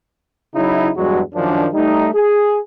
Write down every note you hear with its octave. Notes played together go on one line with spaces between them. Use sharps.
C#3 F#3 D#4 E4
E2 G2 F#3 G#3 F#4
F#2 D#3 F3 D4
G3 A3 D#4
G#4